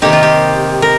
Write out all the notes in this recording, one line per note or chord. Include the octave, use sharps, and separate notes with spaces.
C3 D#3 A#3 D#4 G4
F4
G4
A#4